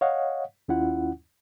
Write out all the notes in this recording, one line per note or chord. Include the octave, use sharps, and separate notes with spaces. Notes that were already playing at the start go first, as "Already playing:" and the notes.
C#5 D#5 F5 F#5
D#2 C#4 E4 F4 F#5